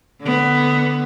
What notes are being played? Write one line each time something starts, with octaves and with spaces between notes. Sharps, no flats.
D3 B3